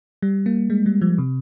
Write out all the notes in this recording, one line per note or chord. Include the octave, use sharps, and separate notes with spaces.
G3
A#3
G#3
G3
F3
C3